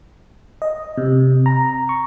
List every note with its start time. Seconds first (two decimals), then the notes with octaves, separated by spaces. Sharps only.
0.62 D#5
0.97 C3
1.46 A#5
1.89 C#6